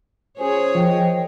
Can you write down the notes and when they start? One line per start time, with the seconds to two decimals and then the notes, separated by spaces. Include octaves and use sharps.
0.39 C#4 F4 G#4 C5 C#5 G#5
0.75 F3 A#4 D#5 G5